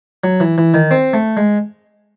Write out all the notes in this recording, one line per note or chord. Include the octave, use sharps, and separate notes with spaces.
F#3
E3
E3
D#3
C4
A3
G#3